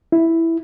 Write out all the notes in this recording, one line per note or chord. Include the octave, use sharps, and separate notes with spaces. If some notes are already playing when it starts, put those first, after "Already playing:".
E4